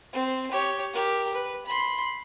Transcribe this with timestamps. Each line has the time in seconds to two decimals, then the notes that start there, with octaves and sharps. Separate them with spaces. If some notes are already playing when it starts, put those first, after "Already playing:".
0.13 C4
0.51 G4 C#5
0.94 G4 A#4
1.34 B4
1.66 B5 C6